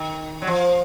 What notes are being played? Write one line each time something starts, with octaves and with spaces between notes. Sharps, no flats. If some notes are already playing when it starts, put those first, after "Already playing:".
Already playing: D#3
F#3
F3